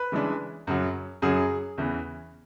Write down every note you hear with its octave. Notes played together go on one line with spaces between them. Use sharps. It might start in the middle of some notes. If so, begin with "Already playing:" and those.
Already playing: B4
C#3 E3 G#3 D4
F#2 C#3 F#3
F#2 C#3 F#3 G#4
E2 C#3 E3